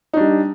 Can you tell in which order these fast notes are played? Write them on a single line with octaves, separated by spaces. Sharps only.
D#4 D4 G3